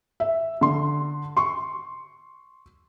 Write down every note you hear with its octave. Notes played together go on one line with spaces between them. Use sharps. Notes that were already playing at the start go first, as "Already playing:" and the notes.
E5
D3 C6
C6 C#6